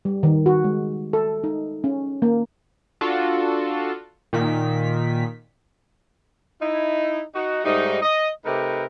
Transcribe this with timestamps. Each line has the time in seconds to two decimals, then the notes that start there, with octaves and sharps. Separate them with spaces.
0.05 G3
0.23 D#3
0.46 F#4
0.64 G#3
1.13 A4
1.44 D#4
1.84 C#4
2.22 A#3
3.01 D4 F4 F#4 A4
4.33 A#2 D#3 B6
6.62 D#4 E4
7.35 D#4 F#4
7.65 G#2 G3 A3 D#4
8.02 D#5
8.45 C3 A3 D#4 G4 A#4 B4